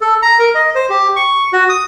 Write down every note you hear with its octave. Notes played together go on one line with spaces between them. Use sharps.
A4
A#5
A#4
D#5
C5
G4
C#6
F#4
D#6